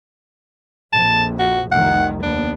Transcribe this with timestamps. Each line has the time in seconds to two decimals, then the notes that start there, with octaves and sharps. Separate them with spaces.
0.93 A#1 F2 A5
1.39 F#4
1.72 F1 C2 D#3 F#5
2.23 D#2 B3 D4